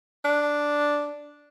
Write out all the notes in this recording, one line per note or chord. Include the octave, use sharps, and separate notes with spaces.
D4